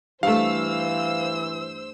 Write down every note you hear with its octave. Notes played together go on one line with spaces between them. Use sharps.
G2 E3 A3 C5 F5 E6